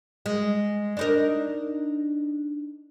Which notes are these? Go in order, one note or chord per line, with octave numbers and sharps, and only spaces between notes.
G#3
D4 D#4 A#4